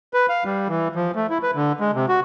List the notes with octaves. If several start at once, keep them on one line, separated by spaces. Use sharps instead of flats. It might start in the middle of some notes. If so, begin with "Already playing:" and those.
B4
F5
G3
E3
F3
A3
E4
B4
D3
G#3
C3
F#4